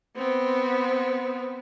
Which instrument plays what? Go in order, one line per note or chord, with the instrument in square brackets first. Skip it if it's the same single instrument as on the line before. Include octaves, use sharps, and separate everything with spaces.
[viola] B3 C4